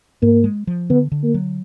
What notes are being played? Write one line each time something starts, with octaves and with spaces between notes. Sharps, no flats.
G#2 A#3
G#3
F3
D3 B3
D3
A#3
F#3